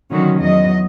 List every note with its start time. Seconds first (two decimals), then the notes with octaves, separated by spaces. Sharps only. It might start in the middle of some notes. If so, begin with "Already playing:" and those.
0.10 D3 D#3 F#3 C#4 F#4
0.39 E2 F#3 D#5